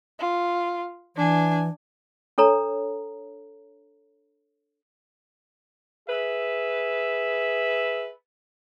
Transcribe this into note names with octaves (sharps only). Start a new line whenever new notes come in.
F4
E3 D4 G#5
D4 A4 C#5 A#5
G#4 B4 E5